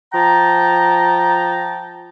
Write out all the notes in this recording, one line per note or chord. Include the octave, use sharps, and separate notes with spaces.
F3 G5 A5 A#5